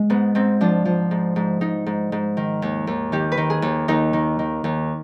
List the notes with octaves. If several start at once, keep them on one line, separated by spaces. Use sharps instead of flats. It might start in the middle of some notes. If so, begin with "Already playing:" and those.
Already playing: G#3
G#2 B3
G#2 C4
F3 D4
F3
G#2
G#2
G#2 D#4
G#2
G#2
D#3
D#2
D#2
D#3 G4
B4
D#3
G#4
D#2
D#2 D#4
D#3
D#3
D#2